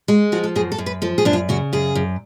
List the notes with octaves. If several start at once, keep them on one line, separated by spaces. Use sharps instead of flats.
G#3 F#4
F3 F#4
A4
F#2 G#4
A4
F#2
B4
F3 A4
G#4
F#2 D4
F4
C#3 F#4
F#2 G#4
F#2